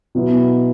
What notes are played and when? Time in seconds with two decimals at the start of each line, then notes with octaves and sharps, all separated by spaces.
0.15 B2 F#3 B3 E4